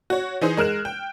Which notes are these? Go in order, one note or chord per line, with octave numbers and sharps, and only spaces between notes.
F#4 C#5
E3 D#4 G#4 C5
G#3 A#4 F6 F#6 E7
G5